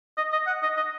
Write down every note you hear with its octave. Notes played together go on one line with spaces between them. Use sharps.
D#5
D#5
F#5
D#5
D#5